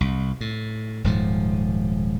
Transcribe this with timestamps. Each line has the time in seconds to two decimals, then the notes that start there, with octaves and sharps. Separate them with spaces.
0.01 C2
0.41 A2
1.04 D#1 G#2 F3